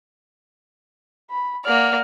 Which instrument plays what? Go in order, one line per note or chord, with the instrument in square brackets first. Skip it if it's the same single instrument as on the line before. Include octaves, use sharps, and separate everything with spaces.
[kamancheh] B5
[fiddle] A#3 D5 [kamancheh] F#5 F6